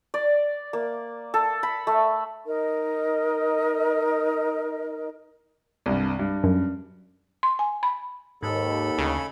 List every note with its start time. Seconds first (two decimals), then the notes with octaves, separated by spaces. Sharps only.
0.14 D5
0.73 A#3
1.34 A4
1.63 B5
1.87 A3
2.47 D#4 A#4 D#5
5.86 C2 G2
6.19 G2
6.44 F#2
7.43 C6
7.59 G#5
7.83 B5
8.43 D#2 G#2 A4 B5
8.98 D2 C#3